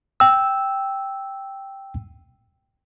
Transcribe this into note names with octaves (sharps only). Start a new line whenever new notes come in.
G5 E6